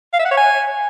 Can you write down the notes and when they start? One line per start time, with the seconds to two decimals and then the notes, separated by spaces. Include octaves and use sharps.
0.13 F5
0.19 E5
0.25 F#5
0.31 C#5
0.37 G#5